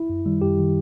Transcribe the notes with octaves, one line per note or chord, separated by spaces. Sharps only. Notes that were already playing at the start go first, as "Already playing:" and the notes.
Already playing: E4
F#2
D#3 G3
F#2 G4
D#3 G3